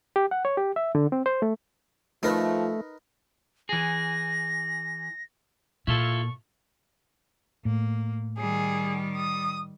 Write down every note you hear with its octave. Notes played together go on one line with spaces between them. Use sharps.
G4
F#5
C#5
G4
E5
D3
C4
C5
A3
F3 A3 D#4 A#4 B4
E3 G#4 A#6
A#2 E4 F4 A4 C#6
A2 A#3
D#3 G3 G#4
D#6